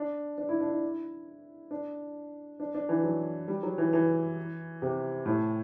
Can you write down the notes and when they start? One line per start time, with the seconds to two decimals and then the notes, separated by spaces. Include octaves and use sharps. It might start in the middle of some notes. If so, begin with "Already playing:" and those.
Already playing: D4
0.38 D4
0.49 E4
0.60 D4
0.71 E4
1.71 D4
2.60 D4
2.75 D4
2.89 E3
3.04 F#3
3.48 G3
3.63 F#3
3.78 E3
3.93 E3
4.82 C3
5.26 A2